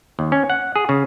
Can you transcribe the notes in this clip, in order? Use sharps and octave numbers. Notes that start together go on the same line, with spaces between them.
D#2
C#4
F#5
G#4
C#3